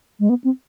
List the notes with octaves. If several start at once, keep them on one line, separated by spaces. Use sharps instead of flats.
G#3
B3
C4